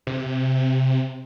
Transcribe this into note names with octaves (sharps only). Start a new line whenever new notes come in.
C3